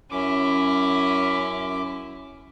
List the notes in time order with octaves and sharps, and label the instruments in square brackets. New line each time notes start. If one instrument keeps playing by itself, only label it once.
[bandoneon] F#2 D6 [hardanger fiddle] C#4 E4